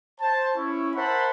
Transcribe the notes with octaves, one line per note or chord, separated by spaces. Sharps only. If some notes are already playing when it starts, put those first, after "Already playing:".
C5 A5
C#4 E4 C#6
A#4 C5 E5 F#5 A5 B5